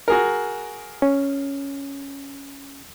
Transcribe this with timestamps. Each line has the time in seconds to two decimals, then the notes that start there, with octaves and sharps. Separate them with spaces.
0.08 F#4 G#4 A#4
1.02 C#4